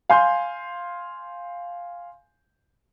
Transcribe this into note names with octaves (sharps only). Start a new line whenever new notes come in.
F5 G#5 C6 G6